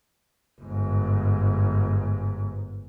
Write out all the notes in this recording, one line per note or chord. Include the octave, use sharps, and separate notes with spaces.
G1 G#2